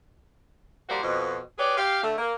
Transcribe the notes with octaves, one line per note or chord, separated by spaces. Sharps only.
F3 G3 A#3 F#4 C5
F2 B2
G4 G#4 B4 C#5 D5
G4 F5
D3 A3
A#3